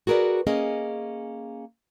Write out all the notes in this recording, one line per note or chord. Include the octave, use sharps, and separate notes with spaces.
F#4 G#4 A#4 B4 D5
A#3 C#4 G#4 D#5